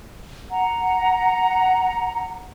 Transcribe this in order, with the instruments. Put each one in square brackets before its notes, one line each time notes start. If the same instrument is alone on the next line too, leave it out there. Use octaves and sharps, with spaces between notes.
[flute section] F#5 A#5